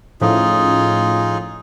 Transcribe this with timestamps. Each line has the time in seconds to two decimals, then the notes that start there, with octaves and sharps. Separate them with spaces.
0.21 A2 F3 C#4 D#4 F4 G#4